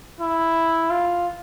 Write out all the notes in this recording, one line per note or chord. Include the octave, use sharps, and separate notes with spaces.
E4
F4